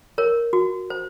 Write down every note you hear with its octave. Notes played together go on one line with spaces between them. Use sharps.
A#4 C#5
F#4
C5